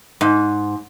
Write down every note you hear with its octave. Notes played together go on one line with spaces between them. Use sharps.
G#2